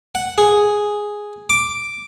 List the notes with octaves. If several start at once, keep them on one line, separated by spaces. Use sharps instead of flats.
F#5
G#4
D6